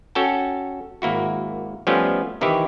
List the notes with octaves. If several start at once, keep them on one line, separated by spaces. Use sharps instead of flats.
C#4 F#4 A4 G5 A5
G#1 A#3 E4 F#4
F3 G3 A3 B3 C#4 F4
C3 D#3 E3 E4 G4